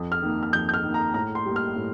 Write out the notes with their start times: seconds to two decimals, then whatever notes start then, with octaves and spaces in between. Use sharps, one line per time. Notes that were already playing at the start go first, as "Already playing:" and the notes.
Already playing: F2
0.12 F6
0.22 D#3 A#3
0.43 F6
0.53 F2 G6
0.69 G6
0.74 F6
0.84 D#3 A#3
0.94 A#5
1.14 A2 A#5
1.35 C6
1.45 G3 A#3
1.56 F6
1.76 A2